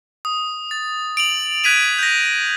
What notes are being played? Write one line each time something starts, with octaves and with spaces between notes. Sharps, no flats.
D#6
A6
D7 F7 F#7
F#6 G#6 B6 D#7 F7
G6 A#6